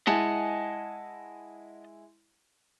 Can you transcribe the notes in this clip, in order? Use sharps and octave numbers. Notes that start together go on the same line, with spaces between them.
G#3 E4 D#5 F#5 G#5 A5